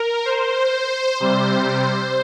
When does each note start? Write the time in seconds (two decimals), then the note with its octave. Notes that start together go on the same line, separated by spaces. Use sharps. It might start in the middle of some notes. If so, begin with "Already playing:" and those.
Already playing: A#4
0.25 C5
1.20 C3 G3 C5